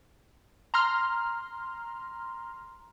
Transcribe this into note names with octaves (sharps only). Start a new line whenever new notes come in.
A#5 C6 F6